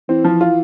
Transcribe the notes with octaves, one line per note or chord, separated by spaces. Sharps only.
E3 C4
F3
F4